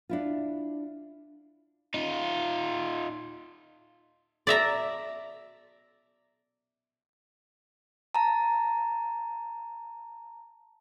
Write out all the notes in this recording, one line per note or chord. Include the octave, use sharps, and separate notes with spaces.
D4 E4 F4
D#4 F4
D5 E5 A#5
A5 A#5